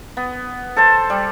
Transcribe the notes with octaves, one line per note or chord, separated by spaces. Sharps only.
B3
A4 C5 A5
G3